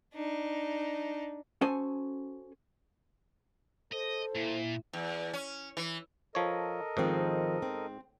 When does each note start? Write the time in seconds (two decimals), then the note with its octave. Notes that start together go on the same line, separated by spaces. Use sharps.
0.14 D4 D#4
1.61 C#4 F#4 A4 C5 G#5 A5
3.92 A4 C5 D#5
4.35 A#2 E4
4.93 E2
5.33 C#4
5.77 E3
6.35 F3 A4 A#4 C#5 D#5
6.97 G#2 D#3 F3 C4
7.62 C4